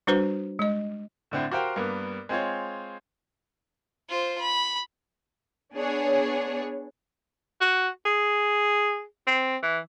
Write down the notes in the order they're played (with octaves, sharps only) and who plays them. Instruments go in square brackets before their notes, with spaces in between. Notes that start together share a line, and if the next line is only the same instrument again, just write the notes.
[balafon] G3 D4 F#4 B4 C5
G#3 D#5
[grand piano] A2 D3 C4 E4
F#4 G4 A#4 C5 F5 G5
G2 A#3 B3
G#3 C4 F4 C#5
[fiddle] F4 C5
B5
[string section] B3 D4 G#4 C#5
[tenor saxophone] F#4
G#4
C4
E3